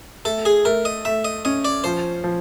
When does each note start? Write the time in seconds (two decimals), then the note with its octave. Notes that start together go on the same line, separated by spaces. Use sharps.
0.25 A3 A4
0.45 G#4
0.65 A3 A#4
0.85 D#5
1.05 A3 E5
1.25 D#5
1.45 C#4 D#5
1.65 D5
1.84 F3 C5
2.24 F3